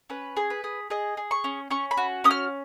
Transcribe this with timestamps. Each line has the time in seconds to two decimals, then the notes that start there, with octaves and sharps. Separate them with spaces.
0.10 C#4 B4
0.37 G#4
0.50 B4
0.64 G#4
0.90 G#4 D#5
1.17 G#4
1.31 C#6
1.44 C#4
1.71 C#4 C#6
1.91 B5
1.97 F#4
2.24 C#4 D#6
2.31 F6